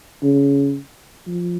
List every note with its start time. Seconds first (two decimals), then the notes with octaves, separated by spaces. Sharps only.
0.23 C#3
1.27 F3